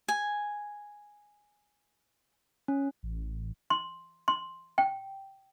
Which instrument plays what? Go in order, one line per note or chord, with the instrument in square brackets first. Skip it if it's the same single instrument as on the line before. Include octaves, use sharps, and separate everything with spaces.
[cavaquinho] G#5
[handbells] C#4
[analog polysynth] A1
[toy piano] C6
C6
G5